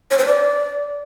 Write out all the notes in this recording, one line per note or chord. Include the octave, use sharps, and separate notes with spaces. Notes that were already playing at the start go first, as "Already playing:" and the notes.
C#5
C5
D5